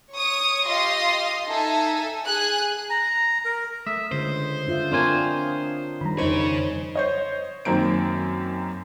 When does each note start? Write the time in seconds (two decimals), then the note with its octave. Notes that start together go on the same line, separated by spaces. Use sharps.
0.13 C#5 C#6 D#6
0.65 F4 G4 D#5 F5 C6 D#6
1.48 D#4 A4 E5 G#5
2.24 G#4 G#5 F#6
2.90 A#5
3.45 A#4
3.87 A3 E5 D#6
4.12 C#2 D3 C5
4.67 D4 F4 E5
4.92 C4 D4 F4 A#4 C#5 G#5
6.01 D#3 G3 A#5 B5
6.18 F2 C#3 D#4 C5 C#5
6.95 C5 C#5 D#5
7.65 F#2 D#3 A#3 C4 D7